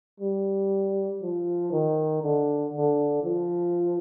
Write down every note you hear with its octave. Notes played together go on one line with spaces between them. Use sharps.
G3
F3
D#3
D3
D3
F3